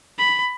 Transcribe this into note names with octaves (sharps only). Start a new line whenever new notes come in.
B5